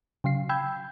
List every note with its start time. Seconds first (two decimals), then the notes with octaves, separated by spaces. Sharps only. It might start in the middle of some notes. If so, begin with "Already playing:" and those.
0.24 C#3 F#3 F5 C7
0.49 G5 B5 E6 G6 G#6